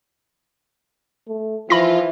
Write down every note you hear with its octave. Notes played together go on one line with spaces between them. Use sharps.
A3
E3 F3 F4 B5 A#6